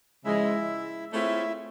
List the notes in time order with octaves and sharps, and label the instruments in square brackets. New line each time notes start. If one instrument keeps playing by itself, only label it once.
[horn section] C#3 F3 G#3 [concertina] E4 E5
[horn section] A3 C4 F4 G#4 C#5 [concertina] E4 E5